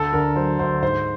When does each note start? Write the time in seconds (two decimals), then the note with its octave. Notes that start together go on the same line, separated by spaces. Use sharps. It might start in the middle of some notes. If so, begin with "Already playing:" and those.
Already playing: D2 A4
0.13 D3 A#4
0.36 F#3 C5
0.59 D2 C5
0.82 G#2 C5